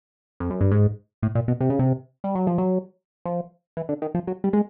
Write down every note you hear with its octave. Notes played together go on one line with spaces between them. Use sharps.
F2
F#2
G2
G#2
A2
A#2
B2
C3
C#3
C3
G3
F#3
F3
F#3
F3
E3
D3
D#3
F3
F#3
G3
G#3